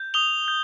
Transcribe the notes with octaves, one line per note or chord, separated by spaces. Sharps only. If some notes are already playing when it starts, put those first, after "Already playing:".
Already playing: G6
D#6 F7 G7
G6